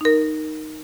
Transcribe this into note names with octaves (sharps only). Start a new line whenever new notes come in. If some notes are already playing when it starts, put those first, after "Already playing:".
D#4 A#4